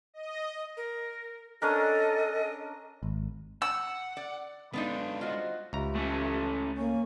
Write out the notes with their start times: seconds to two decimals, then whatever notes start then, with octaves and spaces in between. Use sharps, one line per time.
0.14 D#5
0.77 A#4
1.62 C#4 D4 A4 A#4 D#5
3.03 G#1
3.62 F#5 E6
4.17 D5
4.73 F#2 D3 G#3 B3 D4 D#4 F5
5.21 F4 F#4 C5 D#5
5.73 C#2 F4 G4 E5 A#5
5.96 A3 C#4
6.77 A#3 C#5 G#5 C#6